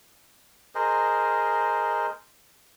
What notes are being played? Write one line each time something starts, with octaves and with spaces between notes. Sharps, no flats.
G#4 A#4 C5 D#5